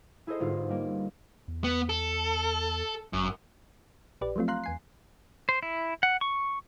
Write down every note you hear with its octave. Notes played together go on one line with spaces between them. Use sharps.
E4 G#4 A4 C5 D#5
G1 G#2 F4
G3 A#3
E2
B3
A4
G1 F#2
A#1 G4 B4 D5
F3 F#3 A3 C4 F4
F5 A#5 C6 F#6
E2 G#5 C7
C5
E4
F#5
C#6